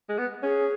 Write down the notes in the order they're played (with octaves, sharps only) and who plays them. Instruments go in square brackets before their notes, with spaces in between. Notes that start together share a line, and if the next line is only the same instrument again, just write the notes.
[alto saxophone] G#3
B3
[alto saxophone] C#4 [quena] G#4